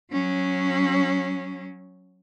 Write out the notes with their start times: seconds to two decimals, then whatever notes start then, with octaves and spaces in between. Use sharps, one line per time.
0.12 F#3 C#4